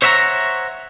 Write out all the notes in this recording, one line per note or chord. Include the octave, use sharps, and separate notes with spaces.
C5 C#5 E5 F#5 A5 A#5